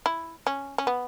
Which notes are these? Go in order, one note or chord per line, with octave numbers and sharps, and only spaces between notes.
E4
C#4
C#4
B3